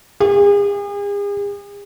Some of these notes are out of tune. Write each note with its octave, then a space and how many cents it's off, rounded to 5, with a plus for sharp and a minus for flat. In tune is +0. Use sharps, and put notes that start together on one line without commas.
G#4 -45